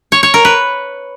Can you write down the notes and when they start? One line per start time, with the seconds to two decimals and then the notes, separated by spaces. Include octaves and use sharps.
0.12 C#5
0.23 C#5
0.34 A#4
0.45 B4